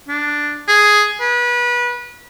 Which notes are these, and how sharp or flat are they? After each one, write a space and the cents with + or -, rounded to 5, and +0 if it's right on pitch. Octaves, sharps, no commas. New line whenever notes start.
D4 +0
G#4 +5
B4 -25